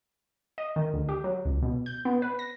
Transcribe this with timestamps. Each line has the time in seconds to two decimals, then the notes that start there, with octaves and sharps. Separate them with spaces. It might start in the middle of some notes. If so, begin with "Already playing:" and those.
0.58 D#5
0.76 D#3
0.94 D2
1.09 G4
1.24 F#3
1.45 C#2
1.62 B2
1.86 G6
2.05 B3
2.22 B4
2.39 A#6